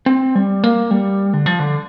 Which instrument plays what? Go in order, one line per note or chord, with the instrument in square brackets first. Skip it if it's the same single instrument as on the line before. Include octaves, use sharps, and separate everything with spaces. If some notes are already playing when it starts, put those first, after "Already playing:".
[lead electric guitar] C4
G3
A#3
G3
D3
F3
D3